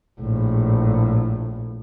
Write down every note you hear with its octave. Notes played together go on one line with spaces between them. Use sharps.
A#1 A2